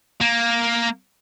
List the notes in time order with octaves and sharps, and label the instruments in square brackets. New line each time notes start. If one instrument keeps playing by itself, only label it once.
[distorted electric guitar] A#3